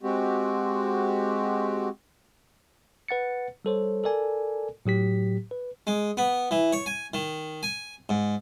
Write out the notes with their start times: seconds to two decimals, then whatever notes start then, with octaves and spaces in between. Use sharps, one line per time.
0.03 G#3 C4 F#4 G4
3.08 B4 F#5 A6 C#7
3.65 G3 A4 C5 C#5
4.04 A4 A#4 D5 G#5
4.86 A2 F#3 G4 B6
5.51 B4
5.87 G#3
6.17 B3
6.51 E3
6.73 C#5
6.86 G#5
7.14 D#3
7.63 G#5
8.09 G#2